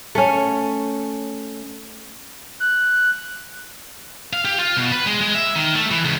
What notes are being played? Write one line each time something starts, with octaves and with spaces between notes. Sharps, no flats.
A3 C#4
F#6
F5
G4
F4
B2
B4
G#3
G#3
E5
D#3
A3
E3
C#2